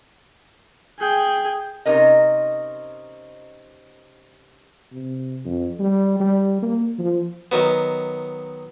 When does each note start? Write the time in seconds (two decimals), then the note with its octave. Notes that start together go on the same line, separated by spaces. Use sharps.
0.99 G#4 G5
1.85 C3 C#4 D#4 A#4 D#5
4.92 C3
5.46 F2
5.80 G3
6.20 G3
6.63 A#3
6.99 F3
7.52 D#3 F#3 B3